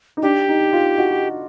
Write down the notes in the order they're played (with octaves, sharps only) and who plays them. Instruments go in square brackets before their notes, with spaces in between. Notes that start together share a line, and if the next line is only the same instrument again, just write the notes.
[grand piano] D#4
[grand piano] D4 [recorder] G4
[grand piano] D#4
F4
F#4